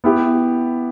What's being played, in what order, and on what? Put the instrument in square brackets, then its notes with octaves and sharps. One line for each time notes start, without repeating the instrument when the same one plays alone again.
[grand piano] B3 E4 G4